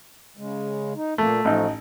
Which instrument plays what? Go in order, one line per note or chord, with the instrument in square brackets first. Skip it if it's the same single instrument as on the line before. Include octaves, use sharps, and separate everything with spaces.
[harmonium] C#3 G#3
D#4
[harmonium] A#2 A#3 [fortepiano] A3
[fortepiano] A1 D#4 [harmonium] F3 A3